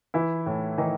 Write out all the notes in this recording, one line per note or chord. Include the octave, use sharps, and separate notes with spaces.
E3 E4
A2
D#3 E3 D#4